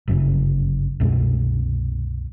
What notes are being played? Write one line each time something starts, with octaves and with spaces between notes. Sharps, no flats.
G1 F#2 C#3
C2 F#2 B2 G#3